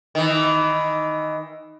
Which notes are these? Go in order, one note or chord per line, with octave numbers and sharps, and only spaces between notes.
D#3 E3